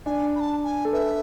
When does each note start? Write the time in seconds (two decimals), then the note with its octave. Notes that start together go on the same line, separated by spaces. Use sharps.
0.06 D4 G#5
0.35 B5
0.40 A5
0.64 G#5
0.85 A4
0.93 B4 E5